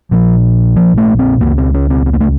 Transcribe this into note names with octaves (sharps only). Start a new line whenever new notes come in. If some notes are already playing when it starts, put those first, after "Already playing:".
A#1 A#2 F3
F3
A3
C4
C#2 C#3 A#3
C4
C#4
C4
C4
A#3
A3